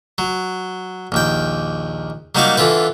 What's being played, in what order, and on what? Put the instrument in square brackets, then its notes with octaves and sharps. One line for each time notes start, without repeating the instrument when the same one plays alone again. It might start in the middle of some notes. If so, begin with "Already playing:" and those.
[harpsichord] F#3
A#1 D#2 G5
F#3 G3 A#3 D#4 F#4 F5
D3 E3 F4 B4